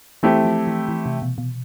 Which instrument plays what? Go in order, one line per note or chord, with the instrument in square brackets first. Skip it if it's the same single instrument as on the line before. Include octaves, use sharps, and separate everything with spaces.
[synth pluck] E3 [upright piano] A3 C4 E4 G4
[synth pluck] F3
E3
E3
C3
B2
B2